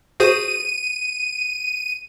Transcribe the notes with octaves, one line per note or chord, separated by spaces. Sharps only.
F#4 G#4 C5 D#7